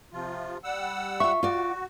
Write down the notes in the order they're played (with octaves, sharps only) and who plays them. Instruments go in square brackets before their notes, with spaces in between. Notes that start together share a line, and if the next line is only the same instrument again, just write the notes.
[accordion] C3 F3 F4
G3 F#5 E6
[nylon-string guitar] F4 E5 [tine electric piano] C#6
[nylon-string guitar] F4 D5 [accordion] F#4